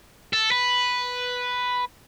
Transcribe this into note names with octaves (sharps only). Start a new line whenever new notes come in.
A4
B4